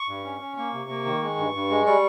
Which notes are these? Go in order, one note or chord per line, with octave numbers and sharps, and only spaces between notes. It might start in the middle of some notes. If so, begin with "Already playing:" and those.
Already playing: C#6
G2
C#4
C#4
A#3 C#6
C3
A#3
D#3
G#3
G2
G2
G#3
G3 C#6